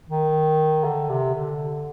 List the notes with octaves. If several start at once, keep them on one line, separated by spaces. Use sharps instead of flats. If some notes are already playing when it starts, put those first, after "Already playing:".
D#3
D3
C3
D3